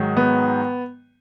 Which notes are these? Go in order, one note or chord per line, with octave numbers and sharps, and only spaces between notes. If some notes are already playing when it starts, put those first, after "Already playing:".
Already playing: G#2 D#3 F#3
B3